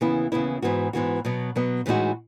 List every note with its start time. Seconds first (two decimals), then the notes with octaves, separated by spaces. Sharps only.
0.01 D#2 C#3 E3 B3 E4
0.32 D#2 C#3 E3 B3 E4
0.62 G#2 E3 B3 F#4
0.93 G#2 E3 B3 F#4
1.25 B2 F#3 B3
1.56 B2 F#3 B3
1.86 A2 E3 G#3 D#4 F#4